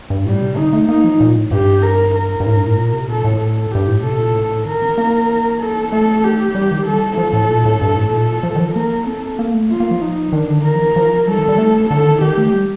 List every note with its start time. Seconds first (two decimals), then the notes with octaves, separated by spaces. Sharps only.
0.10 G2
0.25 A2 G3
0.42 C3
0.57 D3 D#4
0.73 A3
0.88 A#3 D#4
1.04 F3
1.20 A#2
1.36 A2
1.51 G2 G4
1.82 A#4
2.15 A#4
2.40 G2
2.46 A2
2.57 G2
2.67 A2
2.77 A#2
2.93 C3
3.08 A#2 A4
3.24 A2
3.40 A4
3.71 G2 G4
3.87 A2
4.04 C3 A4
4.18 A#2
4.35 A2
4.66 D#3 A#4
4.82 C4
4.98 A#3
5.60 A4
5.92 A3 A4
6.23 G4
6.55 G3
6.71 D#3
6.86 G3 A4
7.17 F3 A4
7.33 A2
7.50 A#2
7.66 A2
7.81 G2
7.96 A2
8.12 A#2 A4
8.43 F3
8.55 D#3
8.60 F3
8.75 A#3 A#4
9.06 C4 A4
9.39 A#3
9.54 A3
9.70 A#3 F4
9.80 A#3
9.91 F3
10.01 D#4
10.32 D#3 D4
10.49 D3
10.64 D#3 A#4
10.75 F3
10.80 D#3
10.96 F3
11.27 G3 A4
11.38 D#3
11.48 G3
11.58 A3
11.89 D3 A4
12.06 D#3
12.21 D#3 G4
12.37 A3
12.53 G3